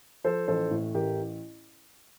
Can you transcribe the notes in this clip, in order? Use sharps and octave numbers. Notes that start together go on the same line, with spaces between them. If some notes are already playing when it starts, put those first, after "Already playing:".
F3 A4 C5
A1 A4 C5
A2
A1 G4 A#4